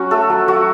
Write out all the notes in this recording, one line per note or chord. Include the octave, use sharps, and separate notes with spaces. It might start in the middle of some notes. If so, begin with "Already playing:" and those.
Already playing: F#3 C#4 F#4
A3 A4
F#3
F#3 F#4